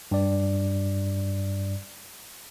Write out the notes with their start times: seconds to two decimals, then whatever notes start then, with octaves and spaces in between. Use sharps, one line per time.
0.11 G2 D5